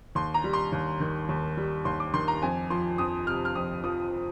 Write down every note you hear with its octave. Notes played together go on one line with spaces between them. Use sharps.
D#2 C6
A#5
G3
C6
D#2
D#3
D#2
G3
D#2 C6
D6
D#3 C6
A#5
F2 G#5
F3 C6
F2 D#6
C3 F6
F6
F2 D#6
F3 D#6